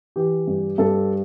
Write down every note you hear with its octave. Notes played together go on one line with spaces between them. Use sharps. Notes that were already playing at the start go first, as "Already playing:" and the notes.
E3 G4
G2
G2 A4